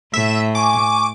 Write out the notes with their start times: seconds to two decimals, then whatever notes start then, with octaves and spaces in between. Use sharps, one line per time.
0.14 A2 E5
0.55 G#5 C#6 D6